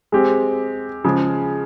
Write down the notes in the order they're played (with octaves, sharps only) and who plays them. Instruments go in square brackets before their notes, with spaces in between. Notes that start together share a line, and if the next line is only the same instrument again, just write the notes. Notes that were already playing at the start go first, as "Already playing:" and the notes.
[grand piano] G#3 C4 G4
C#3 F3 G#3